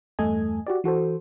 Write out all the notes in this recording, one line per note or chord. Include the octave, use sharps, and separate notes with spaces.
E2 G2 A3 A4 D#5 G#5
F#4 G4 D5
E3 F#4 A4 C5